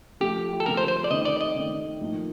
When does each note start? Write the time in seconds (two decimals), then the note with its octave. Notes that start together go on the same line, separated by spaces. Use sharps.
0.20 C3 F3 A3 G4
0.60 A4
0.66 C3 F3 A3 A#4
0.77 C5
0.88 C5
1.04 D5
1.10 C3 D#3 A3 C4 D#5
1.25 D5
1.41 D#5
1.55 C3 D#3 A3 C4
2.01 A2 F3 A#3 D#4